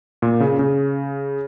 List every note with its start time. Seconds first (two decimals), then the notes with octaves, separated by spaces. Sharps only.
0.22 A#2
0.40 C#3
0.59 C#3